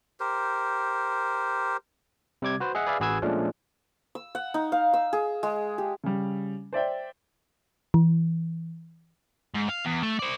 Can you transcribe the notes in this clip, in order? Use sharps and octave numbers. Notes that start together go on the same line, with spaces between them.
G4 A#4 C5
C3 G3 D6 G#6
F#4 B4 C5
G#4 D#5 E5 F#5
G#4 B4 D5 E5 F5
A1 F#4 G#4 B4 E6 G#6
A#2 F3 G#3 A3 C#4 D4
E6
F#5
D#4
F5
E6
G#4
G#3
G4
C#3 G3
C5 D5 E5 G5
E3
G#2
F5
E2
A3
C5 D5